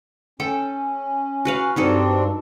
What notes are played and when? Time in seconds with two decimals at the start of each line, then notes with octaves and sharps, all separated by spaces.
0.40 C#4 A4 G5
1.45 F#4 B4 F5
1.76 G2 F#3 C4 D4 D#4 A4